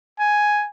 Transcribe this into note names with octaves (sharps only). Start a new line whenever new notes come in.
G#5